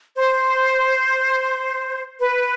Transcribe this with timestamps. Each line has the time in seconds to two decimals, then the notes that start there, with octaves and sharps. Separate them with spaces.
0.17 C5
2.20 B4